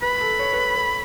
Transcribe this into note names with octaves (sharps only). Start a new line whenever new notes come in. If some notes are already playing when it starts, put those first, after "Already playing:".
B4 B5
A4
C#5
B4
C#5
B4